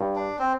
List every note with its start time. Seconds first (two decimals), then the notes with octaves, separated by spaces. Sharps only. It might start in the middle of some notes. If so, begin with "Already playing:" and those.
Already playing: G2
0.16 D4
0.39 C4